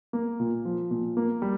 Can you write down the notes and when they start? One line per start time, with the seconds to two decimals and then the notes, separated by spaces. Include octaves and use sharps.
0.13 A#3
0.40 A#2
0.65 F3
0.91 A#2
1.17 A#3
1.42 G3